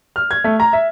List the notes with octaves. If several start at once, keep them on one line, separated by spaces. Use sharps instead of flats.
F6
G#6
A3
A#5
E5